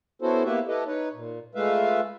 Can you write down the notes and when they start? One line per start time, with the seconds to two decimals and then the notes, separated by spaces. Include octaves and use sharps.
0.22 B3 C#4 E4 F#4 A4 C5
0.45 A#3 B3 E4 G4 B4 E5
0.68 E4 G4 A4 B4 D#5
0.86 D#4 B4 C#5
1.14 A#2
1.55 G#3 A3 F4 B4 E5 F5